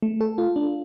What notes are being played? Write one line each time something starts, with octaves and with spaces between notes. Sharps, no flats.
A3
A4
F4
D4